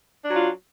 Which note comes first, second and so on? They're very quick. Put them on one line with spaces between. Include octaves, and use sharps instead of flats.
D4 F#3 F4